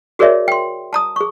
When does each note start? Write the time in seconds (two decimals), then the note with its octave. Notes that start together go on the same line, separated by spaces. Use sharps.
0.19 F#4 G#4 A#4 C#5 D5 E5
0.48 G5 C6
0.93 A5 A#5 D#6
1.16 G#4 C#6